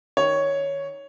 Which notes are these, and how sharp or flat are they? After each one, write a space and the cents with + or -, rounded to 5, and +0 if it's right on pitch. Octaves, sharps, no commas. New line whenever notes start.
D#3 +0 C#5 +5